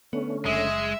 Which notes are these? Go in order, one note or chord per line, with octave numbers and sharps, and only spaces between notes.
D3 A3 B3 C#4
F#1 G#3 E5